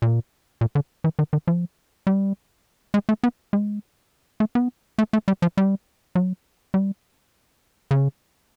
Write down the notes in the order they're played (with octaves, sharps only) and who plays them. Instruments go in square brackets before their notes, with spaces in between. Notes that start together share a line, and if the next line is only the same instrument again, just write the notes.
[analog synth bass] A#2
A#2
D3
E3
D#3
D#3
F3
G3
G#3
A3
B3
G#3
A3
B3
A3
A3
G3
F3
G3
F#3
G3
C#3